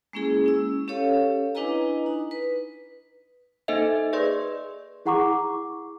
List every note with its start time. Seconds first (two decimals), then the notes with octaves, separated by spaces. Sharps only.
0.13 G#3 A#3 C#4 E4 G#4
0.46 C#4 E6
0.88 C#4 G4 A4 C#5 F5
1.55 D4 E4 B4 D#5 G#5 A#5
2.06 D#4
2.31 B4
3.68 A#3 D#4 A4 C5 D#5 E5
4.13 G#4 B4 D5 D#5 C6
5.05 E4 G#4 F#5 A#5 C#6 D6